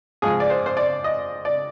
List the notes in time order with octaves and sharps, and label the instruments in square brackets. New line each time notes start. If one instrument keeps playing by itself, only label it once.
[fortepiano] G#2 F3 G#3 G#4
D5
C5
C5
D5
D#5
D5